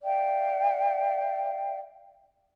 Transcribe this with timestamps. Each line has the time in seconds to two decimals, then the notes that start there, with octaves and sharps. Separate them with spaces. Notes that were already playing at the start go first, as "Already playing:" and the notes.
0.04 D5 E5 F5 G5